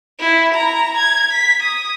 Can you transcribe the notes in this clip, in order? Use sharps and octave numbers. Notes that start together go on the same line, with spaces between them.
E4
A#5
G#6
B6
D#6